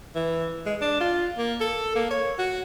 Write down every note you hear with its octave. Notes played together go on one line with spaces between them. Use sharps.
E3
G#3
D4
F4
A#3
A4
A#3
C#5
F#4